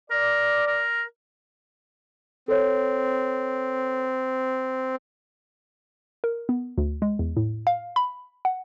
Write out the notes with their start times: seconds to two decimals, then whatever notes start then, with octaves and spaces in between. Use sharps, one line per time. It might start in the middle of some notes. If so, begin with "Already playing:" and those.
0.11 A#4 D5
0.67 A#4
2.48 C4 A4 C#5
6.24 A#4
6.49 B3
6.78 D2
7.02 G#3
7.19 E2
7.37 A2
7.67 F5
7.96 B5
8.45 F#5